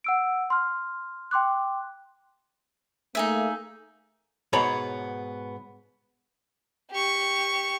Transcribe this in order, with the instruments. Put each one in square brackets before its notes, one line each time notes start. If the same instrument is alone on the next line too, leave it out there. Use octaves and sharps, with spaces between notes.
[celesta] F#5 E6 D7
C6 F6
G5 C6 D6 F#6
[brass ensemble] A3 A#3 [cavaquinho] D#4 G#4 E5
[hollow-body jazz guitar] G#2 B2 B3 C#5 A#5 B5
[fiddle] G4 C#6